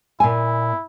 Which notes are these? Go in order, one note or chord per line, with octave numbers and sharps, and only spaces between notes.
A#2 E4 G#5